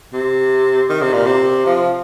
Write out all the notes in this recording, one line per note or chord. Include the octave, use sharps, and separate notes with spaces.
C3
D#3
C3
A#2
C3
F3